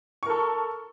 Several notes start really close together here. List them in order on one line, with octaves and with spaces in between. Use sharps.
C#6 A#4 A4